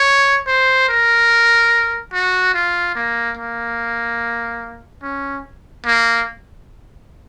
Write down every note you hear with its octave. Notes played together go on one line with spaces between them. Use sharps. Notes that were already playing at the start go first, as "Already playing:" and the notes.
Already playing: C#5
C5
A#4
F#4
F4
A#3
A#3
C#4
A#3